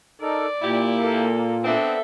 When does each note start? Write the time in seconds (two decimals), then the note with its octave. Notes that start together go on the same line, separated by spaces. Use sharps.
0.21 D#4 A4 A#4 D5
0.62 A#2 E4 G4
0.99 A#3 A4
1.64 B3 C4 D4 A4 E5